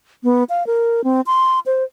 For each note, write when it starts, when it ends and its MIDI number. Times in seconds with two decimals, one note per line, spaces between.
0.24 0.44 59
0.49 0.66 77
0.67 1.04 70
1.04 1.21 60
1.26 1.59 84
1.66 1.84 72